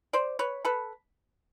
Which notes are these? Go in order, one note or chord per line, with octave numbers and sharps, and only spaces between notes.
C5 D5
B4 C#5
A4 B4